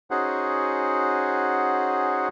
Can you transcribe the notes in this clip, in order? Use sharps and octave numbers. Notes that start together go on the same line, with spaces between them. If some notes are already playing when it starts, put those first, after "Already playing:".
C#4 D#4 F#4 G#4 C5 F#5